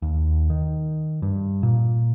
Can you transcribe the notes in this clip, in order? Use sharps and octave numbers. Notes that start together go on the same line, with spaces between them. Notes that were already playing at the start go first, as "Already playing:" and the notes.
D#2
D#3
G2
A#2